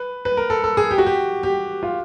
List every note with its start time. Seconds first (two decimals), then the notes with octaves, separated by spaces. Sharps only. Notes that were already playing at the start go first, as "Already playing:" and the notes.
Already playing: B4
0.25 B4
0.37 A#4
0.50 A4
0.64 A4
0.77 G#4
0.91 G4
0.98 F#4
1.06 G4
1.43 G4
1.83 F4